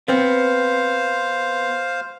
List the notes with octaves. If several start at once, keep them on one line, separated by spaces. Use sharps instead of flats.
B3 C4 C5 F5